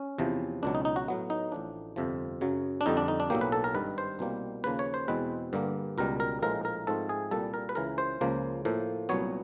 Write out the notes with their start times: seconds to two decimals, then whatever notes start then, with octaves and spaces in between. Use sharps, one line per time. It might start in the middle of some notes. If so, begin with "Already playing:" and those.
Already playing: C#4
0.18 E2 C3 F3
0.63 C#2 B2 F#3 D4
0.75 D#4
0.85 D#4
0.96 F#4
1.08 A2 F#3 B3
1.30 D#4
1.52 A1 A2 F3 D4
1.96 G1 F2 C3 F3
2.41 F#2 C#3 F#3
2.81 D4
2.86 F2 D3 G3 D#4
2.97 D4
3.08 D#4
3.20 D4
3.30 B1 A2 F#3 A#3 G4
3.41 B4
3.52 A4
3.64 A#4
3.74 G#1 G2 D#3 B4
3.98 C5
4.19 C2 B2 G3 A#3
4.64 D#2 C#3 F3 A#3 B4
4.79 C#5
4.94 C5
5.08 E2 B2 G#3 C4 B4
5.53 G2 D3 G3 A#3
5.98 C#2 B2 G3 A#4
6.20 A#4
6.42 A#1 A2 F3 G#3 A#4
6.65 A#4
6.87 G#2 F3 A3 C4 A4
7.09 G#4
7.31 C2 A#2 G3 A#3 A4
7.54 A#4
7.69 B4
7.75 C#2 C#3 E3 A#4
7.98 C5
8.21 C#2 C#3 F3 A#3
8.65 A2 F3 A#3
9.09 C2 A#2 F#3 B3 C#5